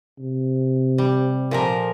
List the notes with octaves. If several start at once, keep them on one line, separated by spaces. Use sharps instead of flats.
C3
G3
A#2 F3 A#4